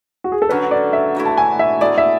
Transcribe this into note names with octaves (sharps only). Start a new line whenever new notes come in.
F#4
G#4
A4
D3 F#3 C#4 B4
D5
E5
D3 F#3 A3 E4
A5
G#5
E5
B2 A3 E4 G#4 D5
E5